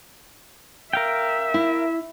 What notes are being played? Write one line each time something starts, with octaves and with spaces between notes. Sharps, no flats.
A#4 E5 F5 G5
E4